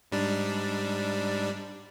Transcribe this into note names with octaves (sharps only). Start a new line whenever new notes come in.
G#2 G3 D4